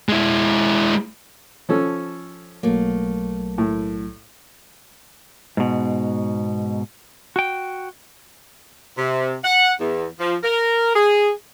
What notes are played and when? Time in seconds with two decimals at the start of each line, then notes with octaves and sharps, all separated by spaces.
0.09 G#3 E4
1.69 F3 C#4 A4
2.63 B1 F#3 A3 A#3
3.58 A2
5.57 G#2 B2
7.36 F#4 G5
8.97 C3
9.44 F#5
9.80 E2
10.20 F3
10.43 A#4
10.96 G#4